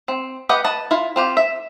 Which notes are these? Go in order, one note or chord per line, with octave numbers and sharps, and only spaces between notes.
C4
G4 B4 D#5 F#5
B4 D#5 A5
E4 F4
C4 F4 G4
E5